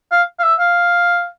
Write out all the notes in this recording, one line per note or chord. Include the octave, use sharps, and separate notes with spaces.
F5
F5
E5
F5